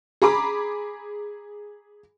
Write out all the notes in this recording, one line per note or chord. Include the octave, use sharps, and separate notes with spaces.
G#4 A#5 B5 D6